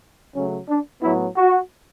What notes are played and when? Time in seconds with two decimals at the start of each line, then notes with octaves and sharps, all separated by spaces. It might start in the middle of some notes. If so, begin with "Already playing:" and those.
0.35 C#3 F#3 A3 C#4
0.69 D4
1.02 A2 F#3 B3 E4
1.37 F#4